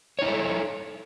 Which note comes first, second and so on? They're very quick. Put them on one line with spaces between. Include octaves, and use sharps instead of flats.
C#5 D#4 E4 A4